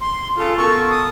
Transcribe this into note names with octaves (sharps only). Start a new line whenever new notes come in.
C6
C#3 F4 A4
B2 A4 A#4 C#6
D#6